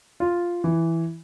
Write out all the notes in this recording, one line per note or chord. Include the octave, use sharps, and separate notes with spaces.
F4
E3